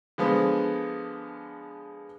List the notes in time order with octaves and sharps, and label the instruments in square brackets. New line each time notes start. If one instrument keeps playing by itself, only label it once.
[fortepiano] D3 F3 G#3 B3